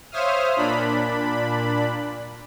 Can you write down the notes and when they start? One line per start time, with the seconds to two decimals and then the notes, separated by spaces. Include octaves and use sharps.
0.12 C5 C#5 E5 F5 D#6 F6
0.56 A#2 D4 B5